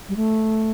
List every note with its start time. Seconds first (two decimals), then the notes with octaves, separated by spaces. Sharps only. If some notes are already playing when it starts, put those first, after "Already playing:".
0.09 G3
0.16 A3